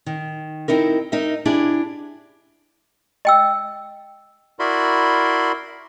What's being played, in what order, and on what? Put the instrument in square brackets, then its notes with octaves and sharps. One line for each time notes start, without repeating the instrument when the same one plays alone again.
[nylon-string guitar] D#3
C4 D#4 E4 A#4
D#4 A#4 D#5 E5
D4 E4 G4 G#4
[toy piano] D#5 G5 E6
[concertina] E4 F#4 A#4 D5 B5 C6